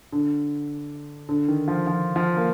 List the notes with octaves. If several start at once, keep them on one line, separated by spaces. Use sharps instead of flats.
D3
D3
D#3
F3
F3
F3
A#3